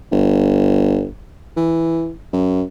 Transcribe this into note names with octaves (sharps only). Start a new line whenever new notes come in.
G1
E3
F#2